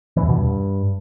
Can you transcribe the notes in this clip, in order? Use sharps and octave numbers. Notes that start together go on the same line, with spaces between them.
E3
E2
B2
G2